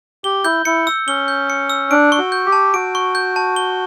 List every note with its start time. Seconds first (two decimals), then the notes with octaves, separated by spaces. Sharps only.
0.24 G4 G7
0.45 E4 G6
0.65 E4 C#7
0.87 E6
1.08 C#4 G7
1.28 G6
1.50 C#7
1.70 E6
1.91 D4 D7
2.12 C#6
2.18 F#4
2.32 G6
2.46 G4
2.52 A5
2.74 F#4 D7
2.95 C#6
3.15 G6
3.36 A5
3.56 G7